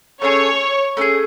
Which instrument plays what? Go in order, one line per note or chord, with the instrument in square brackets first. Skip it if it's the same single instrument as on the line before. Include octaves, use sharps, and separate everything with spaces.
[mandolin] A3 C#4 G#4 [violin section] C#5
[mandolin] A3 C#4 G#4